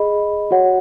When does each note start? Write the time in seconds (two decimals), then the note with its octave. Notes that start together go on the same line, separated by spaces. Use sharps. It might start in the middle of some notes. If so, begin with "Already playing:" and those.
Already playing: G#4 D#5 B5
0.51 F#4 C#5 F#5